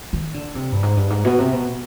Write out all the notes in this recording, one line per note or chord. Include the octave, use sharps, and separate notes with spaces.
D#3
D3
C3
G2
G#2
G2
G#2
B2
C3
B2